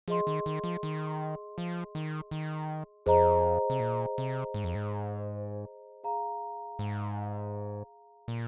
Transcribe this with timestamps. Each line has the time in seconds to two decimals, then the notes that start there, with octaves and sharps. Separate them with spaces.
0.08 F3 G#4 D#5 C6
0.27 D#3
0.46 D#3
0.64 F3
0.83 D#3
1.58 F3
1.95 D#3
2.31 D#3
3.06 F2 G#4 C5 D#5 A#5
3.70 C3
3.80 A#2
4.18 C3
4.54 G#2
4.64 F2
4.75 G#2
6.04 G#4 F5 A#5
6.79 G#2
8.28 A#2